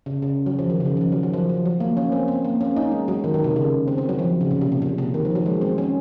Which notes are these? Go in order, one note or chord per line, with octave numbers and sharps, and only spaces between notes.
C#3
C#3
F#3
F3
D#3
C#3
D#3
F3
D#3
F#3
F#3
F3
F3
F#3
A#3
C#4
C4
C4
A#3
C#4
D#4
G#3
F#3
D#3
D#3
C3
C#3
C4
C4
F#3
F3
C#3
A#2
C3
C3
A#2
C3
D#3
F3
F#3
G#3
C4
C#4